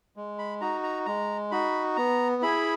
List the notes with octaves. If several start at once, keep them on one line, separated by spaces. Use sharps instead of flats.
G#3
B5
D#4 F#4 A#5
A#5
G#3 A#5
D#4 F#4 B5
B3 A#5
E4 G#4 B5